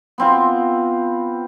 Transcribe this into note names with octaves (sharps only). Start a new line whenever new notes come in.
B3 C4 F4